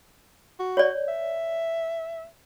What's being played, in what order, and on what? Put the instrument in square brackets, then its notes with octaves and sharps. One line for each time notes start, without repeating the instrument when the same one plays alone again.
[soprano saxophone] F#4
[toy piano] C#5 D5
[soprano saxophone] E5